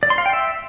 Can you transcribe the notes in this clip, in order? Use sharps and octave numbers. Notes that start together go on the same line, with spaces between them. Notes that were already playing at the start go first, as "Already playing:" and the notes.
D5
C6
F5
G5
E5